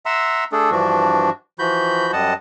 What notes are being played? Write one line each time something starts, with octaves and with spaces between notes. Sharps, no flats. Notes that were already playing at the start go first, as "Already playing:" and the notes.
E5 F#5 A#5 C6 E6
A3 D4 G#4 A4
G2 E3 F3 D4 F#4
E3 F3 F#4 B5 G6
F#2 G3 D#5 F#5 A5